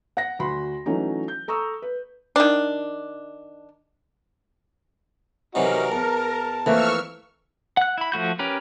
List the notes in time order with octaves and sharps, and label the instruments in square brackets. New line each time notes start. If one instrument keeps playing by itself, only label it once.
[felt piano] F#5 A#6
D2 F#4 B5 C6
E3 F#3 A3 C#4 D#4
G6
A4 A#5 C#6 D#6 E6
B4
[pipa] D#3 D4
[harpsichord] C3 E3 F#3 [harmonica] D#4 F#4 D#5 [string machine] A#4
[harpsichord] E2 [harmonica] A5
[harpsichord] F2 [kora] E3 A3 A#3 [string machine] C#6 E6 F6
[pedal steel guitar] F#5 F#6
E4 B5
F3 A3 F#4 G6
C#4 G4 A#4 B4